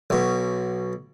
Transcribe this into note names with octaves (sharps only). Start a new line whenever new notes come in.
B1 B2